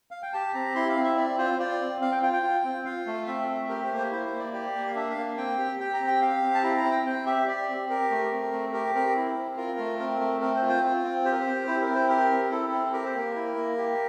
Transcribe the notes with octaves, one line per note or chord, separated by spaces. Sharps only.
F5
G5
G4 A5
C4 A#5
E4 C6
F5
C4
E5
C4 D5
F4 C5
F4 D5
C4
C4 F5
G5
F4 G5
G5
F4
C4
F4 F5
A3
C4 E5
A3
G4 A#4
C5
A#3
C5
E4 C5
C5
A#3
D5
G4 D5
A#3
F5
D4 E5
F5
A#3
C4 G5
G4
G4 G5
A#5
C4
G5
G4 F5
C4
A5
E4 A#5
A#5
C4
G5
C4 G5
G4 E5
G4 D5
C4
G4 A#4
A3
C4
A3
G4 A#4
C4 A#4
E4
C4
F4 A#4
A3
C4 A#4
A3
C4 A#4
C5
F4
C5
F4
C4
G4 C5
A#4
C5
C4
E4 C5
A#4
C4
C5
G4 A#4
C4
E4 A4
C4
G4 A#4
C5
A#3 A#4
E4
A#3
G4